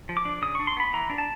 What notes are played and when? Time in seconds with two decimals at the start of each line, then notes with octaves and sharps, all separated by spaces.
0.09 F3
0.17 D6
0.25 D4
0.42 C#3 D#6
0.55 D4 C#6
0.67 C6
0.77 B3 B5
0.93 E3 A#5
1.10 D4
1.18 A5